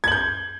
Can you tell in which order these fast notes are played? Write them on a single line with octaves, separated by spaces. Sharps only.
G#6 F#7 G6